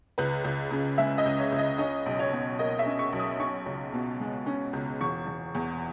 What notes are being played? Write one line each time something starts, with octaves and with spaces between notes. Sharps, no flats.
C#2 B4
C#2
C#3
G#3 E5
D#5
C#2
C#5
C#2
D#5
C#4 D#5
B1
C#5
B2
A#3 D#5
E5
C#4
C#6
B1
D#6
C#4 C#6
C#2
B2
G#3
C#4
C#2
E1 C#6
E1
E2